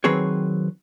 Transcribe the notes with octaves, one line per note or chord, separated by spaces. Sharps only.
D#3 F#3 C4 G#4 B4 C#5